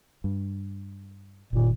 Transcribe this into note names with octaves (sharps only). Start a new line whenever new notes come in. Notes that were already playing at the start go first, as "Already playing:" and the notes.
G2
F#1 A#2 D#3